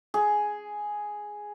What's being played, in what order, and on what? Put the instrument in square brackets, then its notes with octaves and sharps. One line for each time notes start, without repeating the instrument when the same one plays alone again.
[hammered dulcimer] G#4